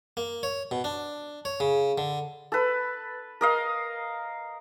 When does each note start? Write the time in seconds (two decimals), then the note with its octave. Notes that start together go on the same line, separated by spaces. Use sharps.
0.17 A#3
0.43 C#5
0.71 B2
0.84 D4
1.45 C#5
1.60 C#3
1.98 D3
2.52 A4 B4
3.41 A#4 D#5 F5